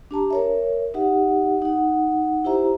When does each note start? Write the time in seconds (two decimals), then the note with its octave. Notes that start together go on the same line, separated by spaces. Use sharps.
0.11 D4 G4 A5 A#5
0.31 A#4 C#5 E5
0.94 D#4 G4 E5 F#5
1.62 D#4 F#5
2.44 E4 G4 C5 E5 A#5